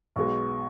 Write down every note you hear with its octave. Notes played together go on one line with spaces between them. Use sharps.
B1 B2 G#3 C#6